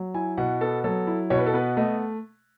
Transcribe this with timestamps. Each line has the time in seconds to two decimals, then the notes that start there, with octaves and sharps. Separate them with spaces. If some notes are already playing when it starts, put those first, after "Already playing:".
Already playing: F#3
0.14 E4 G#5
0.37 B2 F#5
0.61 B3 A4
0.84 F#3 A4
1.07 E4
1.30 B2 C#5
1.38 B4
1.46 A4
1.54 B3 B4
1.77 A3 D#5